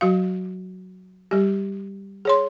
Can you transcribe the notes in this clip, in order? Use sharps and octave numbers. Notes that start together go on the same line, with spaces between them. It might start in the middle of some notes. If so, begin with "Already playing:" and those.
F#3 F#4 F5
G3 G4
G#4 C#5 C6